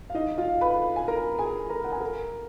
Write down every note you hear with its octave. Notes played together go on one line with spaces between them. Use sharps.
F5
D#4 D#5
F4 F5
B4 B5
G#5
A#4 A#5
G#4 G#5
A#4 A#5
F#5
G#5
A#4 A#5